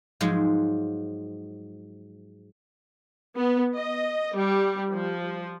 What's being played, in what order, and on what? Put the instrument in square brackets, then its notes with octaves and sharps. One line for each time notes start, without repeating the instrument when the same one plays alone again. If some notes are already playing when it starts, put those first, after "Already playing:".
[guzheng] G#2 F3 F#3 G#3
[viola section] B3
D#5
G3
F3